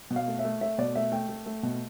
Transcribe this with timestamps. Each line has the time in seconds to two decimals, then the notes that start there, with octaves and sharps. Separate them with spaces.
0.10 B2
0.16 F5
0.28 A3
0.39 E5
0.45 A3
0.61 A3 E5
0.78 B2 D5
0.95 A3 E5
1.12 A3 G5
1.29 A3
1.46 A3
1.63 B2